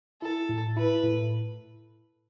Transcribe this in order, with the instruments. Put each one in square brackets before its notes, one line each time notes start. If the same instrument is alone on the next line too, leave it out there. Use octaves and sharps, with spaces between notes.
[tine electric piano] E4 [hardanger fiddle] A4
[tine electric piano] A2
[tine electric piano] E4 [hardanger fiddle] B4
[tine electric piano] A2